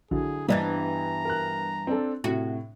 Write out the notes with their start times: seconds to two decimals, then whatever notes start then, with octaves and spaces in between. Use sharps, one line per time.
0.11 A#1 D3 F#3 E4 G#4
0.49 G2 E3 G3 A#3 B3 D#5 A#5 A6
1.25 A#4 F#6
1.87 C4 D4 A4
2.24 A2 C3 F#4